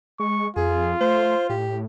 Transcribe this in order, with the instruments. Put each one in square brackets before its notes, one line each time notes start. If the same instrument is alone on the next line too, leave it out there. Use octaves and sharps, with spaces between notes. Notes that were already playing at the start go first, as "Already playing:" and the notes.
[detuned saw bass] G#3 [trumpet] C#6
[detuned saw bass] F2 [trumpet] F4 [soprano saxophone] G#4
[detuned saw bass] A3 [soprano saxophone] C5
[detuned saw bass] A2 [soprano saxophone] G4